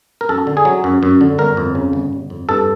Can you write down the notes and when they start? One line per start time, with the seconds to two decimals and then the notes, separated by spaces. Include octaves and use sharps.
0.21 A#4
0.29 F#2 A4
0.47 D3
0.57 G#4
0.65 F#3
0.84 F#2
1.03 F#2
1.21 D3
1.38 G1 A#4
1.57 F2
1.75 C#3
1.93 G1
2.13 G1
2.30 F2
2.49 G2 A4